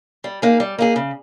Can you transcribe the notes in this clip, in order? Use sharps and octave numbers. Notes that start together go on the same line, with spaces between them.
G3
A#3 D#4 G#4
G3
A#3 D#4 G#4
C#3